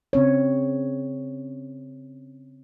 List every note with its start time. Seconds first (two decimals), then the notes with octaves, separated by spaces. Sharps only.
0.13 C#3 C4 C#5